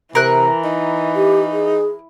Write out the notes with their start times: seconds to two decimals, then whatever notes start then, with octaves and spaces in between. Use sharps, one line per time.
0.15 C3 E3 A#4 F#6
0.64 D#4
1.16 G4
1.52 G#4